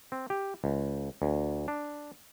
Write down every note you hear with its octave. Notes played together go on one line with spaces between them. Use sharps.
C4
G4
C#2
D2
D4